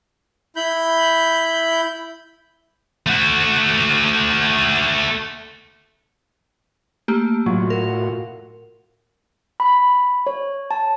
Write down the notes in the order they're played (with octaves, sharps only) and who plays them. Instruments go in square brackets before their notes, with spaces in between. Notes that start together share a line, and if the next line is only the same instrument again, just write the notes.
[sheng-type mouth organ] E4 B5 G6
[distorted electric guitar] A3 F#4
[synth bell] A3 A#3 G4
[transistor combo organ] A2 F4 F#4 [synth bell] F#3
[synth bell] A#4
[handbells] B5
C#5
A5